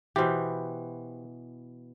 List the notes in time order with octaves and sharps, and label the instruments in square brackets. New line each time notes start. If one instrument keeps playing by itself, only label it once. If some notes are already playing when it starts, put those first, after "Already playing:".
[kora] B2 E3 [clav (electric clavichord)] G4 C5